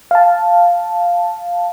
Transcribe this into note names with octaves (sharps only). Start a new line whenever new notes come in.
F5 A5